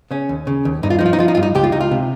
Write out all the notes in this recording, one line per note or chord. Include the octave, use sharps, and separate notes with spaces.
C#3 C#4
D#2
C#3
D#2
G2 D#4
F4
F3 D#4
F4
D#4
F3 F4
D#4
G2 F4
D#4
C#2 G4
F4
C#2 D#4
F4
C3